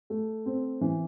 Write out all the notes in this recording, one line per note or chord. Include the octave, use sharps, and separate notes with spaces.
A3
C4
E3